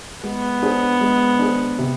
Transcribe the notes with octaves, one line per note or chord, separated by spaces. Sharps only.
G#3 B3
D4 G#4 C5
G#3
D4 G#4 C5
C3